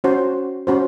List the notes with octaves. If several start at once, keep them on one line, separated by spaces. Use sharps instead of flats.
C#4 F#4 C5
C#4 F#4 C5